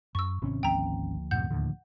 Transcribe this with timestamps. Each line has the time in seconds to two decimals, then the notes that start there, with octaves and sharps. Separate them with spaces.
0.15 F#2 C#6 E6
0.42 G#1 C3 C4 C#4
0.63 D2 F3 A#3 G5 A#5
1.31 F#2 A2 C3 F#5 G6
1.50 D#2 A2 D3